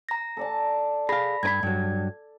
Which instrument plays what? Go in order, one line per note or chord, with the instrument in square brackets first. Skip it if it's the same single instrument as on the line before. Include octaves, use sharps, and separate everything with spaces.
[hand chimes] A#5 A#6
[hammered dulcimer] A4 D5 A5
[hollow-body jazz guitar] G#4 F5 [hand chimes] B5 A#6
[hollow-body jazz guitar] G2 B4 B5 [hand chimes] G#6
[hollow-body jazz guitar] G2 F#3